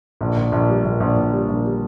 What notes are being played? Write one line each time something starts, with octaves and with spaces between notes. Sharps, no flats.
A#1
A#1
A#1
G3
A#1
A#1
A#1
G3
A#1
G3